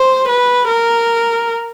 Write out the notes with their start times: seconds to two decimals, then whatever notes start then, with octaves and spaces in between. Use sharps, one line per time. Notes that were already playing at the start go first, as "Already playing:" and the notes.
Already playing: C5
0.29 B4
0.68 A#4